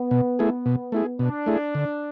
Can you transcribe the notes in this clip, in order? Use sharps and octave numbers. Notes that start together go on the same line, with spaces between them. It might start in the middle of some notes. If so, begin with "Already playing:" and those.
Already playing: B3
B2
A3 E4 G#4
B2
A3 E4 G#4
B2 D4
A3 E4 G#4
D3